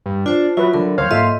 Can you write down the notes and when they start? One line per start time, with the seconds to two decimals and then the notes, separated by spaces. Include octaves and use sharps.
0.06 G2
0.26 D4 F4 C5
0.57 F#3 F4 B4 E5
0.74 D3 F#3 D4 A#4
0.98 D2 F#3 C5 C#5 F5
1.11 G#2 A#3 F4 A4 D#5 E5 C6